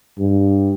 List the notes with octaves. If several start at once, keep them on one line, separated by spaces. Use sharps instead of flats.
G2